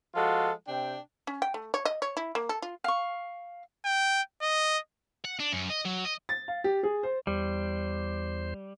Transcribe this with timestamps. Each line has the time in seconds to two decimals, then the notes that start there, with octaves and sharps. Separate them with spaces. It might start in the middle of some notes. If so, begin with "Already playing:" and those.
0.15 F3 G#3 F4 F#4 A4
0.68 C3 D4 G5
1.27 C#4
1.42 G5
1.54 A3
1.74 C#5
1.85 D#5
2.02 C#5
2.17 E4
2.35 A#3
2.49 A4
2.62 F4
2.84 F5 C#6
3.85 G5
4.42 D#5
5.25 F#5
5.40 D4
5.52 F#2
5.70 D#5
5.86 F#3
6.05 D#5
6.29 A6
6.48 F5
6.64 G4
6.83 G#4
7.03 C5
7.27 E2 G3 C5